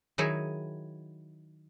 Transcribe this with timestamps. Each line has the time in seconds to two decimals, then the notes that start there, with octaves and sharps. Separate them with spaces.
0.18 D#3 F#3 D#4 E4 G#4